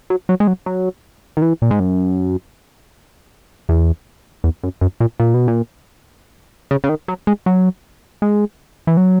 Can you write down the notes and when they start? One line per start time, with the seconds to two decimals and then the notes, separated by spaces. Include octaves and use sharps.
0.10 F#3
0.29 F#3
0.40 G#3
0.47 F#3
0.66 F#3
1.37 D#3
1.42 E3
1.62 A#2
1.71 G#2
1.80 F#2
3.69 E2
4.44 E2
4.63 F#2
4.81 F#2
5.00 A#2
5.20 A#2
5.34 B2
5.48 A#2
6.71 C#3
6.84 C#3
6.89 D#3
7.08 F#3
7.27 G#3
7.46 F#3
8.22 G#3
8.87 E3
8.97 F#3